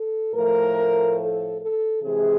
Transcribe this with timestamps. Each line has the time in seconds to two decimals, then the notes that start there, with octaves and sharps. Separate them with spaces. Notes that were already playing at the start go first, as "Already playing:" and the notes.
Already playing: A4
0.33 A2 F3 A3 A#4
1.18 A4
1.60 A4
2.01 C3 E3 G#3 G#4